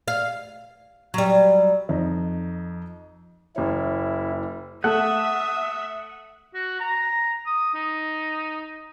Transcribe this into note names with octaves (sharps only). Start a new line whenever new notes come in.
F5
F#3 G3
F2 D#4
F#1 E4 C#5
A3 E5 F#5 D#6
F#4
A#5
D#6
D#4